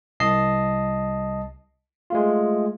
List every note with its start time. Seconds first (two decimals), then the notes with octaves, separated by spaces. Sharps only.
0.20 C2 D#5 A5 C7
2.10 G#3 A3 F4